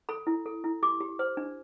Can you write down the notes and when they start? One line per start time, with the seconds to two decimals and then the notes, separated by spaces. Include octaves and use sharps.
0.09 A4 B5
0.27 E4
0.46 A4
0.64 E4
0.83 G4 D6
1.00 G4
1.19 C5
1.37 D4